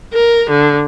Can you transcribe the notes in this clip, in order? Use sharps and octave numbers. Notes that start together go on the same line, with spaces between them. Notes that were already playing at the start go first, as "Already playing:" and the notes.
A#4
D3